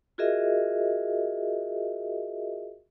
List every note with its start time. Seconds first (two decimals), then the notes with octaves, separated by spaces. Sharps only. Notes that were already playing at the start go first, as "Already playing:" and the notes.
0.18 F4 F#4 G#4 A#4 D#5 E5